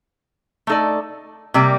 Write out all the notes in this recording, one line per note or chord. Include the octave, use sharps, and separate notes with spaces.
A3 D#4 A4 D5
C3 G3 A#3